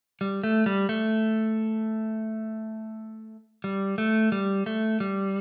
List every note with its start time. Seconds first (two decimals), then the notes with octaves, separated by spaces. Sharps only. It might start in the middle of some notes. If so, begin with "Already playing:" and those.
0.21 G3
0.43 A3
0.66 G3
0.89 A3
3.64 G3
3.98 A3
4.32 G3
4.66 A3
5.00 G3